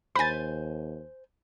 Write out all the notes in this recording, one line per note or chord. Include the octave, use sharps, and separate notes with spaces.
D#2 C5 G#5 B5 A6